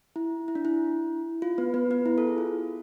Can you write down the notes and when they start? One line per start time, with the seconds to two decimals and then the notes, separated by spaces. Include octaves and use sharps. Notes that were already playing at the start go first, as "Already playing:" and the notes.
0.16 E4
0.48 E4
0.55 D4
0.65 E4
1.42 F4
1.58 B3 B4
1.74 B3 B4
1.91 B3 B4
2.06 E4
2.18 A4
2.27 G#4
2.38 F4